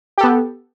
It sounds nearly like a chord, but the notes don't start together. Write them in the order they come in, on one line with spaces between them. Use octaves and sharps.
G4 A4 B3